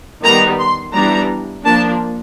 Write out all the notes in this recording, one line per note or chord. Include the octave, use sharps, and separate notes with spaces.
D#3 G3 B3 A#5
C6
E3 G3 B3 D4 A#5
F3 A#3 D4 A5